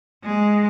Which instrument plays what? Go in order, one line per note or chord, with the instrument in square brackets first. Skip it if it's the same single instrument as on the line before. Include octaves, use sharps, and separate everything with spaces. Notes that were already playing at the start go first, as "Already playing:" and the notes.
[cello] G#3